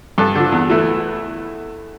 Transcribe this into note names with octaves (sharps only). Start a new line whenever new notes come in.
G2 A4
D3 F3
E2
E3 A3